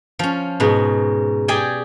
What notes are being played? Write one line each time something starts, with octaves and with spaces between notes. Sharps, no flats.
F3 C#4
G#2 B2
G4 G#4 D5 G5 G#5